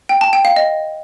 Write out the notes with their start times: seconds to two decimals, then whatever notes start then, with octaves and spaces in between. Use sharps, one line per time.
0.09 G5
0.21 A5
0.33 G5
0.45 F5
0.56 D#5